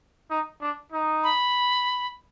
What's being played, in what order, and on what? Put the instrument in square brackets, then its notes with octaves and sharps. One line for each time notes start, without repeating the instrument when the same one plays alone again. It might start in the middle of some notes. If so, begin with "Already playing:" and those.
[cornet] D#4
D4
D#4
[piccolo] B5